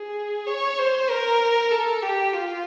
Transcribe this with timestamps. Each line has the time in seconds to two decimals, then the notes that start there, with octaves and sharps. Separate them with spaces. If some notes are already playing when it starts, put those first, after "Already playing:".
Already playing: G#4
0.47 C#5
0.79 C5
1.09 A#4
1.71 A4
2.03 G4
2.33 F4